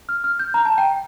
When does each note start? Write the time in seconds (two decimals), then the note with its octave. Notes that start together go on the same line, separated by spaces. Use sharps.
0.09 F6
0.24 F6
0.39 G6
0.54 A#5
0.65 A5
0.78 G5